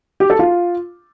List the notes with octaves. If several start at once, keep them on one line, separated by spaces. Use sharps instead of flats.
G4
A4
F4